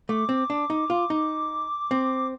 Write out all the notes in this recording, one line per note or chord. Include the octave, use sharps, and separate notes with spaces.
A3 D6
C4
D4
D#4
F4
D#4
C4